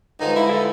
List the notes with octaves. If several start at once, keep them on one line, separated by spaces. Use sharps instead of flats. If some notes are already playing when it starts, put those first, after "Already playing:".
G2 D3 F3 G#3 D#4
E4
A4